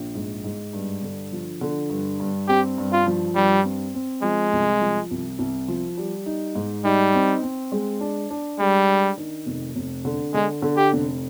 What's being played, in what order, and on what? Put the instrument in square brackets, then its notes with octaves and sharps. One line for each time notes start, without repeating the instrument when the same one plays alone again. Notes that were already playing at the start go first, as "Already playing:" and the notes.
Already playing: [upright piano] A#1
G#2
G#2
G2
D3
F3
D3
G2
G2
[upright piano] C4 [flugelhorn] G4
[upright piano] G2
[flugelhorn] F4
[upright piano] F3
[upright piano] G2 [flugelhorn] G3
[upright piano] C4
C4
[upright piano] F3 [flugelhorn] G#3
[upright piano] C2
F3
C2
C2
F3
G3
D#4
G#2
[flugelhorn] G3 [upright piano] D#4
[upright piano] C4
C4
G#3
D4
D4
[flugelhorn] G3 [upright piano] G#3
[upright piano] D4
D#3
F1
F1
D3
[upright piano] D3 [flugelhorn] G#3
[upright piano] D3
[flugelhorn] G4
[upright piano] F1